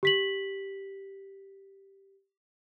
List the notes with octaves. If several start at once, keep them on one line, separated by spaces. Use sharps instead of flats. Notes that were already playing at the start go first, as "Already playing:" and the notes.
G4 B6 F#7